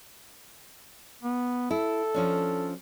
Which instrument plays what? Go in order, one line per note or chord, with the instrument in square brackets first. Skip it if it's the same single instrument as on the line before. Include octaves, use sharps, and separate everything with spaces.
[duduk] B3
[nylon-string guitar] E4 [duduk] A4
[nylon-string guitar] F3 C#4 D4